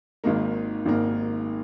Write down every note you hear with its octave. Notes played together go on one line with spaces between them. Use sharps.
G#1 G#2 D#3 A#3
G#1 G#2 D#3 A#3